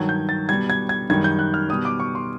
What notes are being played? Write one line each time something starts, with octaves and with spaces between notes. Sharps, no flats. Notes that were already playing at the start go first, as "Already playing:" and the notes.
Already playing: G2 D#3 F#3 G#6
G6
A6
B2 G3 G#6
G#6
G#6
F#2 D#3 G3 G#6
G6
F#6
F6
B2 G3 D#6
D6
C#6
C6